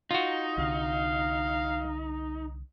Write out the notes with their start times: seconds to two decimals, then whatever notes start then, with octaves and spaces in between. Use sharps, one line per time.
0.11 D#4 F4 F#4
0.58 C2 D3 F5